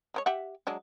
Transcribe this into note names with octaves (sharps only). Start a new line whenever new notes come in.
G#3 C4 C#5
G4 E5 F#5
F#3 G#3 D4